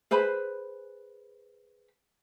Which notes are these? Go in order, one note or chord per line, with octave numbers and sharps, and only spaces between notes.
G#4 B4 C5 B5